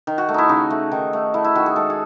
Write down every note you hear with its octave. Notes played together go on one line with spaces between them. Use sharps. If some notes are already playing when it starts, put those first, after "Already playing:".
D#3
F#4
A3
D#4 E4
C#3 D#4
A3
D#3
A3
A3 E4
E4
D#3 F#4
G#4
G#3 A4
G#4